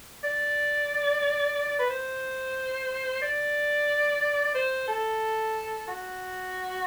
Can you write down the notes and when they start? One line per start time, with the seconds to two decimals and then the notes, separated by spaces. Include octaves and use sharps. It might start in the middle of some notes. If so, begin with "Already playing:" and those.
0.24 D5
1.79 B4
1.90 C5
3.22 D5
4.55 C5
4.88 A4
5.88 F#4